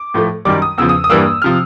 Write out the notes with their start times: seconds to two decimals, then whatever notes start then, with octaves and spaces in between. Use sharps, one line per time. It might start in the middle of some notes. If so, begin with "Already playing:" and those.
Already playing: D6
0.14 A2 F3 A3
0.45 F#2 D#3 G3 D6
0.62 D#6
0.78 E2 C#3 F3 E6
0.89 D#6
1.04 D#6
1.10 G2 E3 G3 A#3 E6
1.42 C3 F3 F6